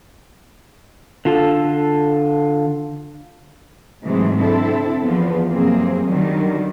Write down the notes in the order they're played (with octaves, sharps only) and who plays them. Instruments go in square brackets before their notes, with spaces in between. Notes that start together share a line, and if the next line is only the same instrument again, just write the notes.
[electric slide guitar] D3 F4 A4
[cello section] G#2 C3 E3 F#3 G#3 A3
D3 C4 E4 A4
E2 F3 B3
F#2 C3 A#3 C4 G#4
D3 D#3 F#3 G3